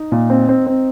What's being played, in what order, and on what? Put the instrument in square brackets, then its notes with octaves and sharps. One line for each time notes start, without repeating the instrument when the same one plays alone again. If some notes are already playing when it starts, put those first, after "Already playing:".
Already playing: [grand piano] D#4
A#2
C4
C4
C4